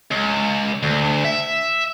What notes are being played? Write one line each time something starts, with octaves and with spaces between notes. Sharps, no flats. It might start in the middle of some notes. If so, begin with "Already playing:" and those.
C#2
D2
E5